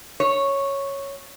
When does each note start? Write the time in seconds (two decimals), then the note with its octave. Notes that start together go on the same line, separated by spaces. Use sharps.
0.20 C#5